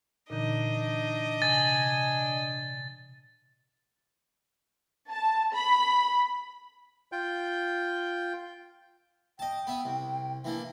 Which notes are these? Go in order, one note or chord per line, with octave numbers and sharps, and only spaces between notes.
A#2 D3 E3 D4 D#4 D#5
C3 G#5 A6
A5
B5
F4 G5 G6
D#5 G5 A5
B3 E5 D#6
C2
E3 A#3 D4